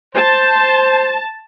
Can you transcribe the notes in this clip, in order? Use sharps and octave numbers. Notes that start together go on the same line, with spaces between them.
C5 A5